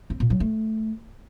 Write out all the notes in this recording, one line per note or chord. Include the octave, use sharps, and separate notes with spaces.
C4
A#2
F#3
A3